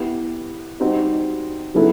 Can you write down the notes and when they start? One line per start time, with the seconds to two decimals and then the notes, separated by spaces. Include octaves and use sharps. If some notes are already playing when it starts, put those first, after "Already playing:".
Already playing: B3 E4 G4
0.80 G3 C4 D#4 F#4
1.74 C#3 F#3 B3 E4 A4